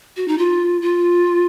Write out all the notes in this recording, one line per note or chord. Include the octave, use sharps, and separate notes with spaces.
F#4
D#4
F4
F4